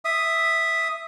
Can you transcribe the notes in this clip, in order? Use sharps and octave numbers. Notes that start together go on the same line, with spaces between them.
E5 D#6